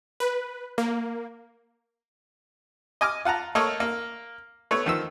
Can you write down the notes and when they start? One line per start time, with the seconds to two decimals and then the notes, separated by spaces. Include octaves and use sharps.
0.20 B4
0.78 A#3
3.01 D#5 G#5 D6 F6
3.25 F4 F#5 A5 A#5
3.55 A3 A#3 A4 C#5 D#5
3.80 A#3
4.71 A3 B3 C#5
4.86 D#3 F3 E6